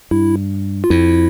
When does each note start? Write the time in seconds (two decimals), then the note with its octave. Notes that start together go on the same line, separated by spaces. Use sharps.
0.11 G2 E4
0.84 F4
0.90 F2 E4